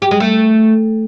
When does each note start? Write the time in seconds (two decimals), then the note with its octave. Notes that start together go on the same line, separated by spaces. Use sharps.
0.02 G4
0.11 G#3
0.20 A3